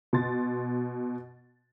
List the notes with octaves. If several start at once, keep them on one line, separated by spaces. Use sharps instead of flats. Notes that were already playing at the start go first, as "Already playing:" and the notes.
B2 C6 A6